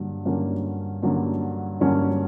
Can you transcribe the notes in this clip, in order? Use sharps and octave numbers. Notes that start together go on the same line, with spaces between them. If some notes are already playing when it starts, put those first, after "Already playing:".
Already playing: G2 D3 F#3 A#3
G2 D3 F#3 A#3 C#4
G2 D3 F#3 A#3 C#4
G2 D3 F#3 A#3 C#4